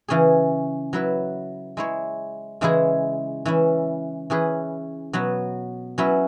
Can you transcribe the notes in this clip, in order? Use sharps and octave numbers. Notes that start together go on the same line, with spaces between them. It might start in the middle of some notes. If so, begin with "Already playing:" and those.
C#3 E3 C#4 G#4
F#3 E4 B4
G#3 E4 C#5
C#3 E3 G#3 E4 G#4
E3 C#4 E4
E3 C#4 G#4 B4
B2 F#3 B3 F#4
F#3 C#4 E4 B4